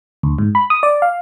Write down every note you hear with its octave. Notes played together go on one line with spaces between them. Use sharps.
D2
G#2
B5
D#6
D5
F5